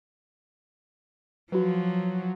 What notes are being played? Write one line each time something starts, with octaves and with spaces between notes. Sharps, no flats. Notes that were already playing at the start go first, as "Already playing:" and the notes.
F3 F#3 F#4 B4